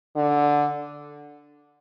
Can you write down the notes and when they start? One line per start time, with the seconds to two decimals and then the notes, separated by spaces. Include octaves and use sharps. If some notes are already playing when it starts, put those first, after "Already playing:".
0.16 D3